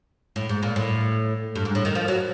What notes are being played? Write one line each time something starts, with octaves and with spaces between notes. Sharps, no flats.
A2
G#2
A#2
A2
G2
G#2
A2
D#3
F3
F#3